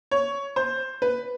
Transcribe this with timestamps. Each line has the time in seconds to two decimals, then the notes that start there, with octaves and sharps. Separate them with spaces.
0.11 C#5
0.56 C5
1.02 B4